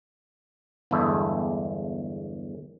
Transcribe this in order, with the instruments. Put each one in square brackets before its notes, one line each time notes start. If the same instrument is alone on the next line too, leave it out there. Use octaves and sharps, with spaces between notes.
[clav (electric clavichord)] G1 E2 G#3 A3 E5